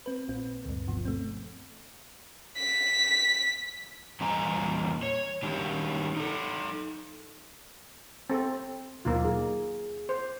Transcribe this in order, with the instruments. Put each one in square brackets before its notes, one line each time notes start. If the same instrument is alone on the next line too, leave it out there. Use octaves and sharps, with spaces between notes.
[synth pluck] C4 B4
A#1 A#2 C4
D2 G2
G1 B2 F3
A3 C4
[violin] B6
[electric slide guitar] E2 A#2 G3 D#5 G#5 A#5
C#5
D#3 G3 D4 D#4 G4 A5
D#4 A4
[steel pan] C4 A4
[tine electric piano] D#2 B2 F#3 [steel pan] A#3 D#4 F4
[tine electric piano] G#4
[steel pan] C5